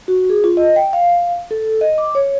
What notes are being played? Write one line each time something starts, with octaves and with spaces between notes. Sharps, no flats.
F#4
G#4
F4
D#5
G5
F5
A4
D#5
D6
C#5